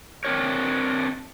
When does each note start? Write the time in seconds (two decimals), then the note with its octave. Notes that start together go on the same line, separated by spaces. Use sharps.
0.24 C4 D4 A#4 C#5